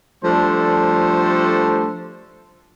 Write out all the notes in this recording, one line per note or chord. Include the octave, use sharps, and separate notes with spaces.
F3 G3 A3 D4 A4 C5